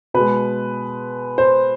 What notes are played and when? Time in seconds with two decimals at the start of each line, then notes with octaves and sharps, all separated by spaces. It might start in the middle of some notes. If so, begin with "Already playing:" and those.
0.14 B2 G#3 B4
1.38 C5